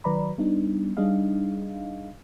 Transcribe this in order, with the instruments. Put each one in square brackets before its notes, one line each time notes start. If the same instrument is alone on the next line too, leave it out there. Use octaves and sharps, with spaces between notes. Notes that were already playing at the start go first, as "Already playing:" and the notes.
[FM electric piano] D#3 F#3 B4 D5 A#5 B5
G3 B3 D4 D#4
G3 D4 D#4 G#4 D#5 F5